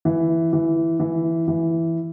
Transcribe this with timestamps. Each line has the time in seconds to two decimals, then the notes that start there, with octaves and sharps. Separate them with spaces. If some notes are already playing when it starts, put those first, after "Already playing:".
0.05 E3
0.53 E3
1.00 E3
1.48 E3